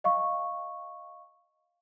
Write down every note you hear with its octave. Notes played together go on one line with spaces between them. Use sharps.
D#5 F5 C#6